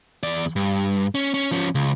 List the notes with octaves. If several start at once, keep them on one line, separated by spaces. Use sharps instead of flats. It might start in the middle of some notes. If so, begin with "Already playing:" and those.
E2 D5
G2
C#4
C#4
F3 C#4
C#2